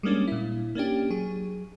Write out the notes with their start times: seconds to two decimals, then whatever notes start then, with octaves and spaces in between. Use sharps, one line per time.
0.03 G3 G#3 A#3 C#4 D4
0.28 A#2 E4
0.75 A#3 C#4 D4 G4
1.10 F#3 G#4